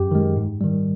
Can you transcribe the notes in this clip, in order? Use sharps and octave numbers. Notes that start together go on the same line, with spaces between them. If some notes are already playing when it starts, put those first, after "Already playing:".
Already playing: F#2 G4
D#3 G#3
G#2
D#3 G3